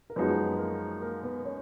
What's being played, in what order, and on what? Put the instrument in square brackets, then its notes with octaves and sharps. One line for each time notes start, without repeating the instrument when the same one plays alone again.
[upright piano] A#4
[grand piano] F#2 F3 G#3 D#4 F#4 [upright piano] B3 B4
[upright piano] B3 B4
A#3 A#4
A#3 A#4
B3 B4
C#4 C#5